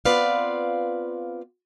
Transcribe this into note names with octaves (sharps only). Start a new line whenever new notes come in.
B3 C4 F4 B4 D5 F5